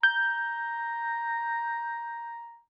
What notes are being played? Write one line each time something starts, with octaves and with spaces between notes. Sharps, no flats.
A#5 G6